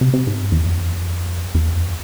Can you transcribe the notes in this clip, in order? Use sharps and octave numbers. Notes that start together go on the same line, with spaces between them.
C3
C3
G#2
G2
E2
F2
E2
F2